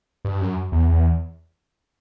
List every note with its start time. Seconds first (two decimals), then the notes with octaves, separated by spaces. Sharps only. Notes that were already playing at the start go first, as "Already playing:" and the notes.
0.25 G2
0.41 F#2
0.72 E2
0.89 E2